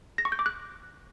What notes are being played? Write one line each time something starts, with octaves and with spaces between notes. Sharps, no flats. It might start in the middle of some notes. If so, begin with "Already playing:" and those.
A#6
C#6
G6
D6
F#6